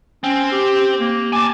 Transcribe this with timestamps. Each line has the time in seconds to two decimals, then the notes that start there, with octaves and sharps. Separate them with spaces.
0.24 C4 C#4
0.52 G4
1.00 A#3
1.33 G#5 A5 D6